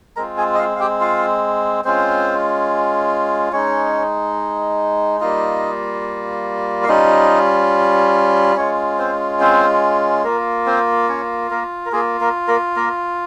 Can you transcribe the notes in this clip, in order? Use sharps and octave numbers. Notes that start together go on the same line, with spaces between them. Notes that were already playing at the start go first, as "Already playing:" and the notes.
G#3 C4 F4 A#4 A#5
G#4 G#5
D#5
F4 F5
F5
G4 G5
F4 F5
G#3 C4 C#4 F4 C5
G#3 C#4 D#4 C#5
G3 A#3 D#4 F4 D#5
F5
G3 C#4 D#4 F4 D#5
G#3 C#4 F4 C#5
C4 C5
C4 C5
A#3 F4 A#4
C4 C5
C#4 C#5
A#3 A#4
A#4
A#3 F4 G#4
A#3 A#4
A#3 A#4
A#3 A#4